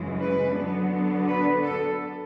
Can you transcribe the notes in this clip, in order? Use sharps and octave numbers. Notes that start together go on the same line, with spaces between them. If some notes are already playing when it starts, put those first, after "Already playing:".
Already playing: F#2 C#3 E3 G#3
B4
D3 F#3 B3 D4
B4
A4